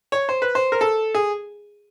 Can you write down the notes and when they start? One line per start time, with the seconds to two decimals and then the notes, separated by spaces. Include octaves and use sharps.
0.12 C#5
0.29 C5
0.42 B4
0.55 C5
0.72 A#4
0.81 A4
1.15 G#4